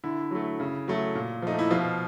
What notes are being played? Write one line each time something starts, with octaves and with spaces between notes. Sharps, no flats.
D3 E4
F#3 A3
C#3
F#3 A3
A#2
F3 A3 D#4
E4
B2 F3 F4